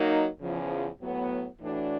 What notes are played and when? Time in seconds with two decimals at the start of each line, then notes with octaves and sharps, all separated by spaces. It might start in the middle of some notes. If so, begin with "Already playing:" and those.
Already playing: F#3 A#3 D#4
0.40 E2 C#3 F3
1.00 A2 F#3 B3
1.59 A2 E3 A3 D4 F#4